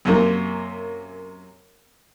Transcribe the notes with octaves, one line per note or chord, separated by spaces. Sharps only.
F#2 C3 A#3